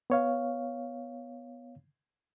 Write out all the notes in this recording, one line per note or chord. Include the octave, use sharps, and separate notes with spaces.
B3 C#5 F5